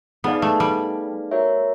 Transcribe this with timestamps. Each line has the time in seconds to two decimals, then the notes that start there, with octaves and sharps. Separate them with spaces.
0.24 B3 D#4 G#4 B4 D5 F5
0.42 A3
0.60 G3
1.31 F#4 A#4 C#5 E5